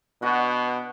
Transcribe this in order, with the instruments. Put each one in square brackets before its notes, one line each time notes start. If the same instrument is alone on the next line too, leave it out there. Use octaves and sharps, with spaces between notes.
[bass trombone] B2 [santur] D4 F#4 F#5